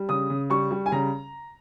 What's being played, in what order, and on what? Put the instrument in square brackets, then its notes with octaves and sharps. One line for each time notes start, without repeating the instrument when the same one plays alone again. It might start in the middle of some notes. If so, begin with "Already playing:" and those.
Already playing: [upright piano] G3
C#3 D#6
C#3
G3 C#6
G3
G#5
C#3 A#5